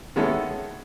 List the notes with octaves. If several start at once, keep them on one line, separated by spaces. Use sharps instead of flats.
D#3 G#3 B3 C#4 E4 A4